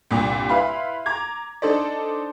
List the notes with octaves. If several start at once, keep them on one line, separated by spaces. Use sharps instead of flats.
C2 G2 A#2
E4 B4 F5 B5 C6
A#5 D6 G#6
D4 D#4 A4 C5 D5